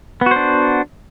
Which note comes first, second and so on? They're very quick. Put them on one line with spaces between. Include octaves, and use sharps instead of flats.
B3 F#4 C5 D4